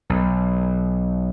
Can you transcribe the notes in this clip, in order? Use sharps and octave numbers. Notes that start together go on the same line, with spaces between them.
B1